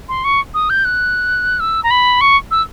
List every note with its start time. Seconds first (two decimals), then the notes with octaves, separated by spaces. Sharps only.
0.09 C6
0.24 C#6
0.54 D#6
0.70 G6
0.85 F#6
1.60 E6
1.83 A#5
1.91 B5
2.21 C#6
2.51 E6